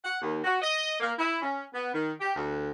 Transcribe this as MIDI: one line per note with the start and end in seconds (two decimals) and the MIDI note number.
0.04 0.18 78
0.22 0.39 39
0.43 0.58 66
0.61 0.96 75
0.99 1.11 58
1.18 1.40 64
1.41 1.64 61
1.73 1.92 59
1.94 2.12 51
2.20 2.35 67
2.36 2.71 38